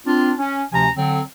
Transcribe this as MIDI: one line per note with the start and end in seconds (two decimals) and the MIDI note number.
0.06 0.33 60
0.06 0.33 62
0.06 0.33 65
0.38 0.62 61
0.73 0.88 38
0.73 0.88 48
0.73 0.88 53
0.73 0.88 61
0.73 0.88 80
0.73 0.88 82
0.96 1.21 50
0.96 1.21 54
0.96 1.21 60